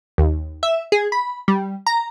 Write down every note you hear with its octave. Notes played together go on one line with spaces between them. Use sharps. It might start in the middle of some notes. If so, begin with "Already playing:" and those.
D#2
E5
G#4
B5
G3
A#5